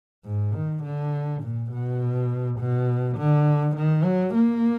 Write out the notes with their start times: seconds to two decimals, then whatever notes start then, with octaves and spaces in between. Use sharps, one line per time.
0.25 G#2
0.54 D#3
0.84 D3
1.42 A#2
1.71 B2
2.59 B2
3.18 D3
3.76 D#3
4.04 F#3
4.35 A#3